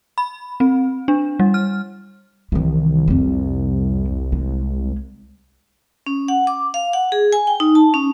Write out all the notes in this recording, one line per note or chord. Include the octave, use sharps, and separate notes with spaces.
B5
C4
D4
G3
F6
C2 D#3 E3
F2 G3
G#3
C#4
F#5
D6
F5
F#5
G#4
G#5
G5
D#4
A5
C#4